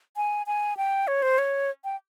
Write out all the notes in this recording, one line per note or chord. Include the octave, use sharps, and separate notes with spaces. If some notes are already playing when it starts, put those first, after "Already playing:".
G#5
G#5
G5
C#5
C5
C#5
G5